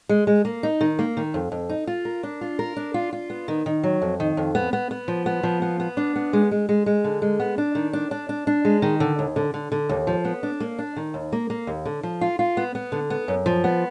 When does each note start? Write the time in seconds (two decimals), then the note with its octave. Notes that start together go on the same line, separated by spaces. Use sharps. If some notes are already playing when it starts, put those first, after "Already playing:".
0.09 G#3
0.27 G#3
0.45 A#3
0.63 D#4
0.81 D#3
0.99 A#3
1.17 D#3
1.34 F2
1.52 F2
1.69 D#4
1.87 F4
2.05 A#4
2.23 D4
2.41 F4
2.59 A#4
2.76 D4
2.94 F4
3.13 F4
3.30 B3
3.48 D#3
3.66 D#3
3.84 F#3
4.02 F2
4.20 D#3
4.37 F2
4.55 B3
4.73 B3
4.91 B3
5.08 F3
5.26 B3
5.43 F3
5.62 B3
5.80 B3
5.97 D4
6.16 B3
6.33 G#3
6.51 G#3
6.69 G#3
6.86 G#3
7.04 D3
7.22 G#3
7.40 B3
7.58 D4
7.75 D#3
7.93 D4
8.11 D4
8.29 D4
8.47 D4
8.65 G#3
8.82 D#3
9.00 D3
9.19 D#2
9.36 D3
9.54 D3
9.72 D3
9.89 D#2
10.07 F3
10.25 B3
10.43 D4
10.60 A#3
10.79 D4
10.96 D#3
11.14 D#2
11.32 A#3
11.50 A#3
11.67 D#2
11.86 D3
12.03 F3
12.21 F4
12.39 F4
12.57 B3
12.75 B3
12.92 D3
13.10 B3
13.28 F#2
13.46 F3
13.64 B3